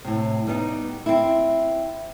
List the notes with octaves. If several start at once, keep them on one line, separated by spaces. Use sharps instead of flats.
A2 C3
G3 B3 D4 D#4
C4 E4